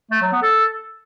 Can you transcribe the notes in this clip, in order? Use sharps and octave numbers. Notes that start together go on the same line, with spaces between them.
A3
F#3
B3
A4